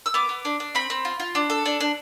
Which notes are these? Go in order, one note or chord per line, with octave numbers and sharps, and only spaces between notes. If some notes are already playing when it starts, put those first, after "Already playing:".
E6
B3 D6
B3
D4
D4
C4 B5
C4
F4
F4
D4
A4
D4
D4